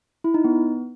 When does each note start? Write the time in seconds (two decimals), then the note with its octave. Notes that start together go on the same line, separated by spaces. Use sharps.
0.24 E4
0.34 D#4
0.44 B3